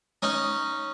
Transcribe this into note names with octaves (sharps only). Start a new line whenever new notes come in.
C#4 D#4